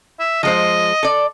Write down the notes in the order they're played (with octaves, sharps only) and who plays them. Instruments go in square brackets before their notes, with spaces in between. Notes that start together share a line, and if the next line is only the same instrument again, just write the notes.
[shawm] E5
[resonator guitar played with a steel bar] F3 G#3 C5 [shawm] D#5
[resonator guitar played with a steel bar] A4 D5